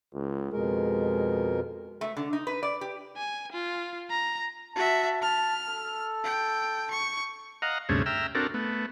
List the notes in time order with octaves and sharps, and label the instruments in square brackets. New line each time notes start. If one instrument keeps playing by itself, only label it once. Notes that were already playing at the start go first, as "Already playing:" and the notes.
[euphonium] C#2
[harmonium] F2 B2 A#4 [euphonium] G#3
[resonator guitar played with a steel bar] A3
D3
D#4
B4
D5
G4
[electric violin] G#5
F4
A#5
[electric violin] F#4 E5 [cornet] A5
[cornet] A5 [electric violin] F6
[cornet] A4
[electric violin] G5
C#6
[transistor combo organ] D#5 F5 F#5 A#5
D2 G2 C3 A3 C#4 G#4
E5 G5 A#5 E6 F6
C4 D4 F#4 A4 A#4
A3 B3